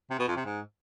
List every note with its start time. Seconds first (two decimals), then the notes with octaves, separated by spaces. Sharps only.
0.10 C3
0.19 B2
0.28 F2
0.36 C3
0.45 G#2